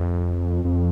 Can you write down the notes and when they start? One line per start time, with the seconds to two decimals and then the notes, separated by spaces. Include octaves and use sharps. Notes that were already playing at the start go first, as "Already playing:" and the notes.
Already playing: F2
0.65 F2